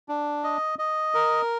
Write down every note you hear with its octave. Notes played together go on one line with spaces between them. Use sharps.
D4
D#5
D#5
A#4